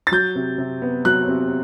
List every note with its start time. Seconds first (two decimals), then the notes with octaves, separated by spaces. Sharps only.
0.07 A6
0.12 F#3 G6
0.35 C3
0.58 C3
0.82 B3
1.05 F#3 F#6
1.28 C3